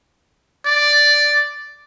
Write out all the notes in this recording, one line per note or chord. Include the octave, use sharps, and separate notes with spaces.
D5